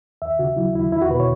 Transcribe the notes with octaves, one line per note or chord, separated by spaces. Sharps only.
D#2 E5
C#3 F#4
F#3 E4
D#2 E4
E2 E4
F#4
B2 B4
C#5